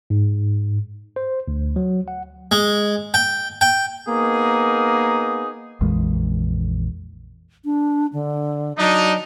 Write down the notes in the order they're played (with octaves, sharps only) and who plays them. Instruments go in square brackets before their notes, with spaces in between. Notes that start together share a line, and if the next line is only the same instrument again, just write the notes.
[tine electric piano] G#2
C5
D2
F#3
F#5
[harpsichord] G#3
G5
G5
[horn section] A#3 B3 D#4 G#4
[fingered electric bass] A#1 F2 E3 G#3
[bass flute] D4
D3
[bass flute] F#3 [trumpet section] D4 D#4